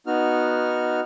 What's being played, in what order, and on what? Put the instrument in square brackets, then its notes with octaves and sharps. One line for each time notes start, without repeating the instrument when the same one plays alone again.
[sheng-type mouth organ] B3 D#4 F#4 F6